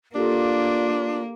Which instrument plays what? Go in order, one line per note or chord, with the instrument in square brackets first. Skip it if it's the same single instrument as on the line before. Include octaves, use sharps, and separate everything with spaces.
[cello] A#3 [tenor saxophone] D4 [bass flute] F4 [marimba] G4 A4